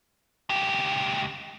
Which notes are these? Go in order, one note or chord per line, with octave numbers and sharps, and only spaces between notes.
C#2 G4